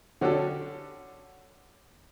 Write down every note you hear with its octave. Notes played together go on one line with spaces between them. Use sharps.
D3 C#4 F#4 G4 A4